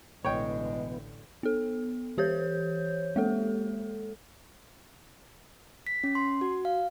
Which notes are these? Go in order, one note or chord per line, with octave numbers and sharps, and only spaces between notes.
A1 B2 D3 E3 G#3 B3 C#5 G5
B3 A4
E3 G4 C5 C#5 G6
G#3 A#3 A4
B6
C#4
C6
F#4
F5